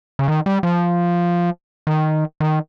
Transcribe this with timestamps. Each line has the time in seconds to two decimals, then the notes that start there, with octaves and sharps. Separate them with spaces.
0.19 C#3
0.28 D#3
0.46 G3
0.63 F3
1.87 D#3
2.40 D#3